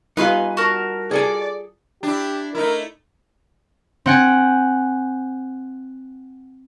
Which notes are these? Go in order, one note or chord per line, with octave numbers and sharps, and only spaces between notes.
G3 D#4 F4 G4 B4 F5 G#5 C6
F#4 A#4 A5
G#4 A4 D5 G#5
D4 E4 G4
A3 D#4 E4 A#4
C4 F#5 G#5